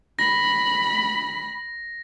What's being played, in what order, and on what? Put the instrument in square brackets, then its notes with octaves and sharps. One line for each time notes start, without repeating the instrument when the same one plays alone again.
[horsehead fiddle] B5 [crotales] A#6